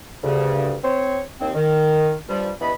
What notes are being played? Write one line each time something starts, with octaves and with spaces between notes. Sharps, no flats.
D2 G2 C#3
C4 C5 C#5
D#2 C4
D#3
G2 F3 G3
G2 E3 B3 D#5 B5